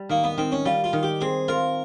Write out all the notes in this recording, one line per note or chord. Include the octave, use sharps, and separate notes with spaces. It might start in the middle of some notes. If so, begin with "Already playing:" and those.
Already playing: G3
D#3 A#3
B3
D#3 C4
C#4
G3 F4
F4
D#3
G4
C4 G#4
F4 A#4